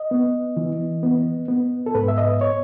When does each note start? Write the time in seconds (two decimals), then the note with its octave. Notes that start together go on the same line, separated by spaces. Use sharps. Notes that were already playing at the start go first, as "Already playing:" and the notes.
Already playing: D#5
0.11 B3
0.57 E3
1.03 B3
1.48 B3
1.86 A4
1.95 G#2 B4
2.08 E5
2.18 D#5
2.41 C#5